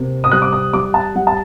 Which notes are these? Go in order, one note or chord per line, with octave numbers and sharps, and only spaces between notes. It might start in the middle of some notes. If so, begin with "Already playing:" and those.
Already playing: C3 A#3
D#6
G3 F#6
D6
D#6
G3 D6
A5
G3 F#5
A5